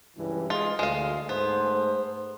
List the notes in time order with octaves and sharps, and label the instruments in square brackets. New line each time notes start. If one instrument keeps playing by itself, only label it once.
[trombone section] C#2 G2 E3
[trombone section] G#3 [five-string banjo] F4
[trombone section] D2 [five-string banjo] G#3 F5
[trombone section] G#2 A3 C5 [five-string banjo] B3